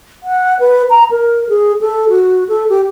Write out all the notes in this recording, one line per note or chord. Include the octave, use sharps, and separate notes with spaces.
F#5
B4
A#5
A#4
G#4
A4
F#4
A4
G4